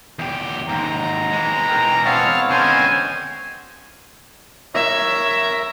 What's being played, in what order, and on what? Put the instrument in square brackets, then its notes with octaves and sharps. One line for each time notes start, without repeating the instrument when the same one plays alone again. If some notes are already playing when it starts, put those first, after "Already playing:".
[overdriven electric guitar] E2 G4
[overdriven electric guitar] D#2 G#2 [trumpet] A#5
[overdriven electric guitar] E3 G#3
[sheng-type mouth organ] A#4 G5
[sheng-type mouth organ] B3 C4 [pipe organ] C#5 A5 F6 [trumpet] F5
[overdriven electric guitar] D3 G#3 [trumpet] C#4 [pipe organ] C5 G#5
[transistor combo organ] A#4 [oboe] C#5 [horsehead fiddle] E5